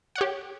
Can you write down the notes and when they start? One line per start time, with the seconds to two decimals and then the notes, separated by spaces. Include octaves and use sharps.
0.15 F#5
0.18 C#5
0.21 G4